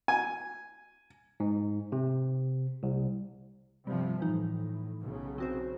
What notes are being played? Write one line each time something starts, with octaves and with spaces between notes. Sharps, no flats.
G#5
G#2
C3
C2
G1 C3 F3 G3
A2 E3 D#4
B1 C#3
C4 F#4 C5